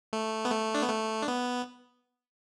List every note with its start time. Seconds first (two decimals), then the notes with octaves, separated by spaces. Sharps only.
0.13 A3
0.45 B3
0.51 A3
0.74 D4
0.82 B3
0.89 A3
1.22 D4
1.28 B3